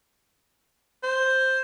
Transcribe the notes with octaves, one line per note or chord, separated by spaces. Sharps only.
C5